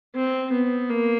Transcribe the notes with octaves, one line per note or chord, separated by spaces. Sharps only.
C4
B3
A#3